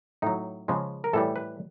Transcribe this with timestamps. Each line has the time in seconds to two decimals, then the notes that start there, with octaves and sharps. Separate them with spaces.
0.22 A2 F#3 D#4
0.68 C#3 F3 G#3
1.04 A#4
1.13 A2 E3 G3 A4
1.36 B4